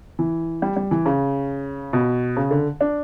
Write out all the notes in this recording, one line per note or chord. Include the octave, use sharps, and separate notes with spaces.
E3
G3
G3
E3
C#3
B2
C#3
D3
D4